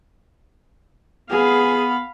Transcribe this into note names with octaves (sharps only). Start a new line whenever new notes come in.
B3 G#4 F5 B5